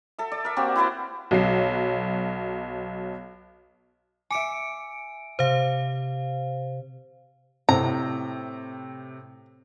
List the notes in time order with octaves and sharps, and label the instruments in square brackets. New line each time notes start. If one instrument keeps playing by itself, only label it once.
[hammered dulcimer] A4 E5
D5
A#4 E5
A#3 C4 F#4 G4
E4 B4 C5 D5
[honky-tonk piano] B1 F#3 C7
[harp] E5 D6 [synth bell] G#5 C#7 D7
[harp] C3 [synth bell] C5 F5
[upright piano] A2 C3 C4 [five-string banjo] A#5